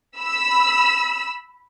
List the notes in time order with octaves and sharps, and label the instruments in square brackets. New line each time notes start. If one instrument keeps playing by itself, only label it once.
[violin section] B5 E6